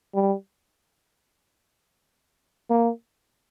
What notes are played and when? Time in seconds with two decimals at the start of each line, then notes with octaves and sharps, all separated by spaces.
0.15 G3
2.70 A#3